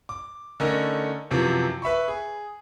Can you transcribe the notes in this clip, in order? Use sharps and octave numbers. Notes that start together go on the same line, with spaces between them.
D6
D3 A3 C#4 D#4 A#4
F#2 C3 E3 F3
B4 E5 B5 C#6
G#4